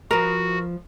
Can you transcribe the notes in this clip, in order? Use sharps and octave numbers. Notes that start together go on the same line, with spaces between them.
F3 F#4 A#4 B4